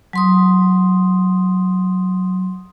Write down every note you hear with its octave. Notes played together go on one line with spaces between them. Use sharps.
F#3 C6 D#6